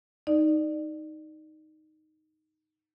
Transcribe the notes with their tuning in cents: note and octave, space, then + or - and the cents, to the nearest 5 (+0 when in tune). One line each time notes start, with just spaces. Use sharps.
D#4 +0 D5 +20